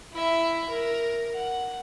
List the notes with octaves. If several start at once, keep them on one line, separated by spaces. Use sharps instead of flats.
E4 E5
A#4
F#5